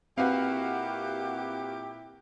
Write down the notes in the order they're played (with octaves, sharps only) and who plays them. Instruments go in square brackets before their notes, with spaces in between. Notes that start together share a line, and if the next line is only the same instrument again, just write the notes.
[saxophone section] A#2 E4 G4 [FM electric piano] C4 [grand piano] F#4 B4 F5